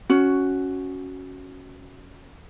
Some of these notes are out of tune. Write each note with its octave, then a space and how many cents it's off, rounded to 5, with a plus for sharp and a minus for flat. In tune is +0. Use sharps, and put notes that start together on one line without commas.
C#4 +0 F#4 +0